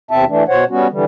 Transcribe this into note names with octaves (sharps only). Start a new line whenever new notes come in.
E2 C3 C4 E5 A5
E3 A3 D4
B2 C5 C#5 F#5
G3 B3 C#4 F#4
D3 E3 G3